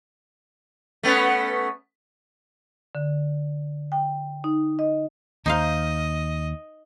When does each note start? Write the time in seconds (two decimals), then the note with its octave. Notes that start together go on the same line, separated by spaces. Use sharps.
1.03 A3 B3 C#4
2.95 D3
3.92 G5
4.44 D#4
4.79 D#5
5.46 D#2 D#4 C5 D#5 F5